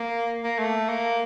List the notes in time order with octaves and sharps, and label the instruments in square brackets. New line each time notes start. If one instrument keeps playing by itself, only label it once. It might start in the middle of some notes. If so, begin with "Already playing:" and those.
Already playing: [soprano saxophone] A#3
A#3
A3
A#3